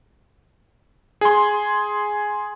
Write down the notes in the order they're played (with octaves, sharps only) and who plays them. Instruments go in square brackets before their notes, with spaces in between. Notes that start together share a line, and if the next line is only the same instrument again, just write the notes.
[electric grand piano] G#4 C6